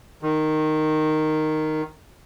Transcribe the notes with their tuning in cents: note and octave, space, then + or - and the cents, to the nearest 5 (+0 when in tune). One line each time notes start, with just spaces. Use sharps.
D#3 -5